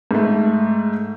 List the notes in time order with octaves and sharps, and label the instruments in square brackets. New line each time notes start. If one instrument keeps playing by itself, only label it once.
[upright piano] G#2 A3